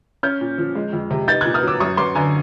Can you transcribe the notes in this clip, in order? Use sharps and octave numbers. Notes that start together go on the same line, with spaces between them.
C#4 F6 G6
A#2
F3
G#3
F2
C3
D#4 G6 A6
F#6 G#6
A#2
D#6 F6
F#3 D6 E6
F#2 C#6 D#6
F#2 C6 D6
D3 G#5 A#5